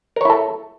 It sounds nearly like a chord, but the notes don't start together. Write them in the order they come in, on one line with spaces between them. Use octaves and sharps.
A#4 C#5 E4 A4